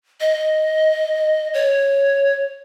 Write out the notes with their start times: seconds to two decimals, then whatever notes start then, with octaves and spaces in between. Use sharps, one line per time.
0.21 D#5
1.54 C#5